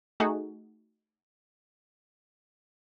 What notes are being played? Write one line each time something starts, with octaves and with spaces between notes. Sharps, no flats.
A3 D#4 F#4 G#4